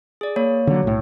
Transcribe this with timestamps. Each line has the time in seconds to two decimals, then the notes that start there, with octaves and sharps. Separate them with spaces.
0.21 G#4 D5
0.36 A#3 C#5
0.67 D3 F#3
0.83 B1 A2